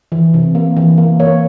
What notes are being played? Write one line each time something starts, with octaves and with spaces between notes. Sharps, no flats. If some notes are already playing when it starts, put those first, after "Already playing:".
E3
C3
A#3
E3
A#3
A#3 C#5